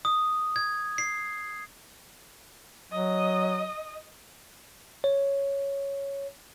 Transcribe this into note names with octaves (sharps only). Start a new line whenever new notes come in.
D#6
G#6
C7
F#3 D#5
C#5